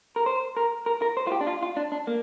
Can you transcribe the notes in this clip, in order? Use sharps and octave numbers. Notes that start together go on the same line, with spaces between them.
A#4
C5
A#4
A#4
A#4
C5
F4
G4
D4
F4
F4
D4
D4
A#3